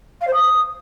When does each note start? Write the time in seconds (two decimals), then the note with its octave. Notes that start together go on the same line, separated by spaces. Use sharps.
0.21 F5
0.27 C5
0.33 D#6